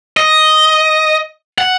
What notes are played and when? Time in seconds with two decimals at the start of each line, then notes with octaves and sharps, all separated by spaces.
0.17 D#5
1.58 F#5